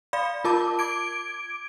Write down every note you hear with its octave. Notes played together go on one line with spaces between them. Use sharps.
D5 F5 B5
F4 A#4 A5 D6
D6 G#6 D7